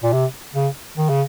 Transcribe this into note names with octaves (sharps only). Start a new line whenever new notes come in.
A#2
C3
C#3
D#3
C#3